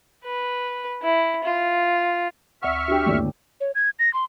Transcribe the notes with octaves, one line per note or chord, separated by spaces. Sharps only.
B4
E4
F4
D2 E5 F#5 C#6 F6
D4 F#4 G4
G1 D#2 A2 D3 D5 E6
C#5
G#6
A#6
C6